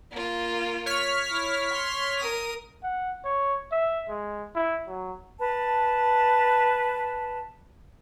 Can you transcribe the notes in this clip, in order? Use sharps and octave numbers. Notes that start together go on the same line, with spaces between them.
A#3 F4
C#5 F6 B6
E4
C6
A#4 D#6
F#5
C#5
E5
G#3
E4
F#3
B4 A5